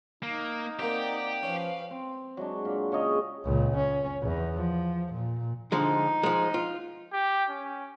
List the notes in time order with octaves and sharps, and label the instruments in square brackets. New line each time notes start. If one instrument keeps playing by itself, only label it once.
[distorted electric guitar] A#3 [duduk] D#4
[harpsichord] A#3 C4 [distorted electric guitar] G4 [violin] D5 F#5
[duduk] F3 [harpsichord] C#4 [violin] B4 F5
[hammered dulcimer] C4
F#3 G#3 D4
A#2
C#3 C#5 D#5 A#5
[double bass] C#2 A#2
C#4
E2
F3
A#2
[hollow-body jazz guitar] D3 F3 G#3 [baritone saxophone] D#4
[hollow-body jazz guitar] F3 G#3
F4
[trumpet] G4
C#4